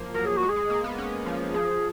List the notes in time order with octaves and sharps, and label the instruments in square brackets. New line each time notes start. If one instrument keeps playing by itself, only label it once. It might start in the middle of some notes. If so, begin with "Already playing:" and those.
Already playing: [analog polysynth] F3 A#3
[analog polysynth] F#3 [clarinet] A#4
[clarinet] G#4
F#4
[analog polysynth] G#3
[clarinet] G#4
[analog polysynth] G#3
A#3
B3
C#4
F3
[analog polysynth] F3 [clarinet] G#4